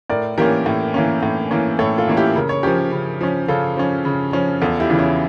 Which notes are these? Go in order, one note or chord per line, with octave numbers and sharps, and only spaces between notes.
A2 A#4 D5
E3 A#3 C#4 G4 A#4
A2
E3 A#3 C#4
A2
E3 A#3 C#4
A2 A4 C#5
F4 A4
E3 A#3 C#4
E4 G4
C#3 A#4
C#5
F3 C#4 G4 A#4
C#3
F3 C#4
C#3 F4 A4
F3 C#4
C#3
F3 C#4
E2 F4 A4
E4 G4
C#3 E3 F4
C#4 E4